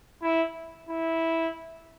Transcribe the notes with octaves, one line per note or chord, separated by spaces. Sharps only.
E4
E4